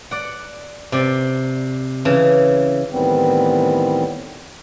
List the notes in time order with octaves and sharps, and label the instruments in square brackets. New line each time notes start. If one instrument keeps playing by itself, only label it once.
[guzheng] D5 F#5
C3 D5
C#3 E3
[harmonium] A2 D#3 E3 G3 B3 C4